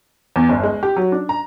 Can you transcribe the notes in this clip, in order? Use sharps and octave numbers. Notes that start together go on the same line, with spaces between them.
E2
G1
G#3
G4
F#3
D4
A#5